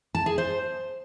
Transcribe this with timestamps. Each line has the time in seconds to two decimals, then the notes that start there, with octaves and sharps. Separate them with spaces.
0.15 A5
0.26 G#4
0.38 C5